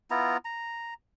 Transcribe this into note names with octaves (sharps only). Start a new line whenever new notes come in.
B3 E4 F4 A#5
A#5